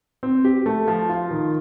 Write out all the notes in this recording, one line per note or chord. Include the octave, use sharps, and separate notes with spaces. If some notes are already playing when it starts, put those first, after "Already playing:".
C4
G4
A3
F3
F4
D#3